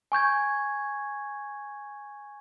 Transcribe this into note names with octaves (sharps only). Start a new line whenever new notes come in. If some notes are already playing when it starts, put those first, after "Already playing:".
G#5 C#6 G6 G#6